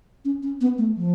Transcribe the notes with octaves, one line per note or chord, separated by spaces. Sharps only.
C#4
C#4
B3
A3
F3